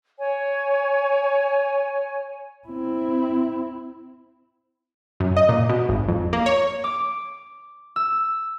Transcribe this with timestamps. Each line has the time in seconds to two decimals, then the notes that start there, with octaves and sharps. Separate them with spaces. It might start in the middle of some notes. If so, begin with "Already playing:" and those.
0.19 C#5 G#5
2.68 C4 E4
5.20 F#2
5.37 D#5
5.49 A#2
5.69 B2
5.89 G#1
6.08 F2
6.33 A#3
6.46 C#5
6.84 D6
7.96 E6